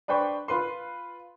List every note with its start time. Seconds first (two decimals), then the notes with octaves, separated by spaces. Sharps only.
0.08 D4 B4 C5 G5 B5 C#6
0.48 F4 B4 C6